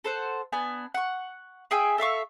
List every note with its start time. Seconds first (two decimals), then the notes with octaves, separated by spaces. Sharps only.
0.04 A4 C5 F#5
0.52 B3 D4 G#5
0.94 F#5 C#6
1.71 G#4 E5 G5 G#5
1.98 A4 E5 F5 C#6